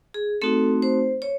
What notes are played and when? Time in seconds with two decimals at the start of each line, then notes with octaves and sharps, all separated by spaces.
0.14 G#4
0.42 A3 C4 D#4 F#4 A4
0.82 C5
1.22 C#5